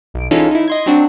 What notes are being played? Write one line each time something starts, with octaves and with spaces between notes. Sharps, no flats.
B1 D7
E3 G#3 C#4 D#4 F4 A4
D#4 E4
D#5 C6 G#6
F#3 C4 D4 F#4